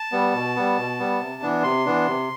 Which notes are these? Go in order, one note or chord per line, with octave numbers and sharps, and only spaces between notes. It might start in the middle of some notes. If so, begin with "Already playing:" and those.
Already playing: A5
G3 B3
B2
G3 B3
B2
G3 B3
C3
E3 B3 D4
C3 C6
E3 B3 D4
C3